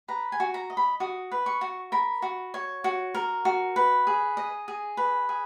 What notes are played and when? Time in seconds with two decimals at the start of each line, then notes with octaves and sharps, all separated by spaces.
0.08 B4 A#5
0.32 G#5
0.40 F#4
0.54 A#5
0.70 D#5
0.77 B5
1.00 F#4 D#6
1.32 B4
1.46 C#6
1.61 F#4
1.92 A#4 B5
2.22 F#4
2.54 C#5
2.84 F#4
3.14 A#4
3.45 F#4
3.76 B4
4.07 G#4
4.37 D#5
4.68 G#4
4.97 B4
5.29 G#4